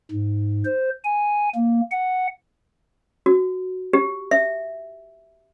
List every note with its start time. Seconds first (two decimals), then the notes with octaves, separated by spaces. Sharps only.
0.12 G#2
0.65 C5
1.04 G#5
1.55 A#3
1.91 F#5
3.26 F#4
3.93 G4
4.31 E5